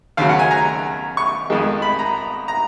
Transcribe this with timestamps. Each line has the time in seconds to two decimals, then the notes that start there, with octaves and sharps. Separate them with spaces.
0.17 D#2 C#3 F#3 F5
0.29 F#5
0.39 G#5
0.51 A#5
1.17 C#6
1.50 F2 D#3 G#3
1.82 B5
1.99 A#5
2.48 A#5